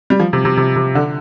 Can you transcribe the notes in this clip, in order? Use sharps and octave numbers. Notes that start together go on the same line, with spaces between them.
G3
F3
C3
C3
C3
C3
D3